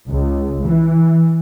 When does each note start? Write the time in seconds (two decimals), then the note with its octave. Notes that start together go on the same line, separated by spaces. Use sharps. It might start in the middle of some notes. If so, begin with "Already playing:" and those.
0.11 C#2
0.67 E3